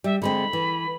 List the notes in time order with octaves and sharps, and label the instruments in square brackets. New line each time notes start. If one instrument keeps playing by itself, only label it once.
[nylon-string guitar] G3 [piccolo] E5
[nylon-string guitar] D3 G#3 C4 [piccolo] B5
[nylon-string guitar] E3